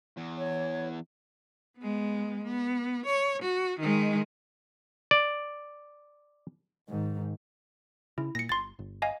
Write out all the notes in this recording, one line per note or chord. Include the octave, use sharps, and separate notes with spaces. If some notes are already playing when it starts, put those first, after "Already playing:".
E2
C#5
G#3 B3
B3
C#5
F#4
D#3 G#3
D5
G#2 D#3
C#3 E4
A#2 A#6 C#7
G1 C6 A6
G1
D#5 F5 G#5